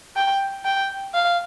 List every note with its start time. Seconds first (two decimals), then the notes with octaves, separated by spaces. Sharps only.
0.16 G5
0.65 G5
1.14 F5